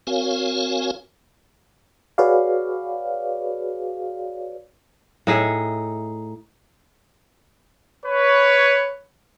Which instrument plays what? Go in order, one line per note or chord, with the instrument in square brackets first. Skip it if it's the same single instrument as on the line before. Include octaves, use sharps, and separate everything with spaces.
[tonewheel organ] C4 F#4 A#4 C#5 F5 G#5
[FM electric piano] F#4 G#4 B4 C#5 D5 F5
[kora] A2 D#4 G#4 E5
[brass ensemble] B4 C#5